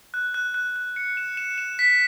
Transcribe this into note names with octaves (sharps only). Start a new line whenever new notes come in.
F#6
F#6
F#6
F#6
C#7
E7
E7
E7
B6